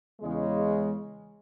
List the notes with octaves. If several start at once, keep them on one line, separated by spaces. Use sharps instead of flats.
E2 C#3 G#3